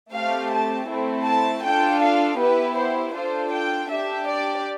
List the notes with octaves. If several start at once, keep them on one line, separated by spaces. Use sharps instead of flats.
A3 C4 G4 F5
A5
A3 C4 E4 A4
A5
D4 F4 A4 G5
F5
B3 E4 G4 B4
C5
D4 F4 A4 C5
G5
D4 G4 E5
D5